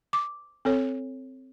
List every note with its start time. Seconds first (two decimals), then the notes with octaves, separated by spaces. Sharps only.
0.13 D6
0.65 C4 A4 C#5